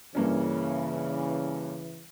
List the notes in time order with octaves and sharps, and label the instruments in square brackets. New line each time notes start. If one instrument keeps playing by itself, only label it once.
[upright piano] G2 A#3 C#4 [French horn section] C#3 E3